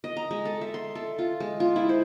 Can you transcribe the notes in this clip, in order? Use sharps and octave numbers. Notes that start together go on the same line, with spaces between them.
D#5
A#5
G#3
A4
E5
C6
A4
F4
G#3
F4
E4
C5